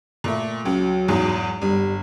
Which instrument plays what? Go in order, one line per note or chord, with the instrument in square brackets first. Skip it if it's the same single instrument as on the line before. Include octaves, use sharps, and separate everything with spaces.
[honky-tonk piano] A#2 A3
[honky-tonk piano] C#2 [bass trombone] F#3
[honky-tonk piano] E2 G#2
[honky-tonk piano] G1 [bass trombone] G3